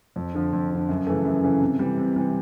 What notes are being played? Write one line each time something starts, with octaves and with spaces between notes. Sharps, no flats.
F2
D3 F3
F2
D3 F3
F#2
C#3 E3 A3
F#2
C#3 E3 A3
C3
E3 G3
C3
E3 G3